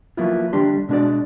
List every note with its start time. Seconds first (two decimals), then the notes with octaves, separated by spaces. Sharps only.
0.17 F3 F#3 A#3 B3 E4 F4
0.53 D3 G3 D4 G4 C6
0.89 B2 G#3 D4 F#4 D5